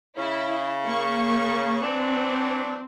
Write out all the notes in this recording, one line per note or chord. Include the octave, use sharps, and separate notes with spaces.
C#3 E4
A#3 C#6
E3 F#3 C4 D4